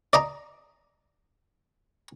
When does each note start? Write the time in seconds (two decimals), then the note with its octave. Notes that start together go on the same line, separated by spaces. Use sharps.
0.13 D5 D#5 A#5